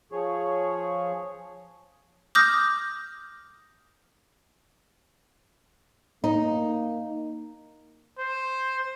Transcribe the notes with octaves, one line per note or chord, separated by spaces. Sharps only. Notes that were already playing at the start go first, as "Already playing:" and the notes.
F3 G#4 C#5
D6 D#6 F6 G6 A#6
A#3 D#4
C5